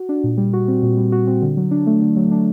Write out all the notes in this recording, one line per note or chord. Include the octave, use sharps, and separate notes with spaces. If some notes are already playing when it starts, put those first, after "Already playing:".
Already playing: F#4
D4
A#2
G3
F#4
C4
A#2
G3
F#4
C4
D3
F#3
D4
A3
D3
F#3
D4